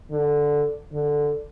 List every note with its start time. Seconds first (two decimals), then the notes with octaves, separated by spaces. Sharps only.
0.11 D3
0.92 D3